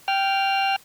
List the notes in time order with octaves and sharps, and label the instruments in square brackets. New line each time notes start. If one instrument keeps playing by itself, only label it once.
[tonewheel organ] G5 F6